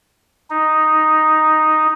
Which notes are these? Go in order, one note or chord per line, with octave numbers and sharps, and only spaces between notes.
D#4